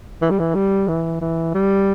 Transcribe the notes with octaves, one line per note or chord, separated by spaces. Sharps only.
E3
G3
E3
G3
E3
E3
G3